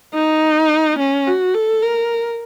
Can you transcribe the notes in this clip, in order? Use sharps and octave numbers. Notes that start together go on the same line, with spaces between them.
D#4
C#4
F#4
A4
A#4